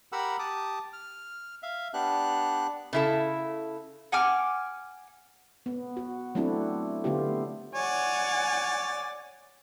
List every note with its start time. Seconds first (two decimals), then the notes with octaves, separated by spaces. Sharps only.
0.12 G4 A#4 F#5 B5 E6
0.39 G4 A5 D6 D#6
0.93 F6
1.63 E5 F5
1.94 B3 D4 G4 F#6
2.93 C#3 E4 A4
4.12 F#5 G#5 D6 F6
5.66 B3
5.97 F#4
6.35 F#3 A3 C4 D4 E4 F#4
7.04 D3 A3 B3 F4 G4
7.74 C#5 D5 F#5 G#5